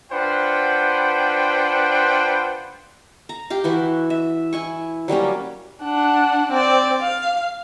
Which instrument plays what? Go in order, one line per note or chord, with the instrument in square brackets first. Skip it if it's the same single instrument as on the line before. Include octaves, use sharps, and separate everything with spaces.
[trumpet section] D4 F4 B4 C5 F#5 G5
[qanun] A#5
G4 F5
E3 E4 F#4
E5
E4 G#5 C#6
F#3 G3 A#3 C#4
[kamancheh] D4 F#5
C4 D5
F5